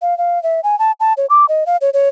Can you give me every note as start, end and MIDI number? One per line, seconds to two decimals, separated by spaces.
0.02 0.17 77
0.18 0.41 77
0.43 0.60 76
0.64 0.78 80
0.79 0.92 81
1.00 1.13 81
1.17 1.26 73
1.30 1.46 86
1.49 1.64 75
1.66 1.77 77
1.81 1.90 73
1.94 2.09 73